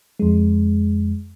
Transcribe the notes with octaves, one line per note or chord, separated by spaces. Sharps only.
F2 G#3